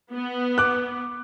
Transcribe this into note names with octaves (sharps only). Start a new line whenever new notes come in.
B3
D6 F#6